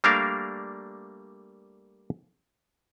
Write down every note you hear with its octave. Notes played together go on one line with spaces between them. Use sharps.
G3 A3 A#3 D4 A#4 F5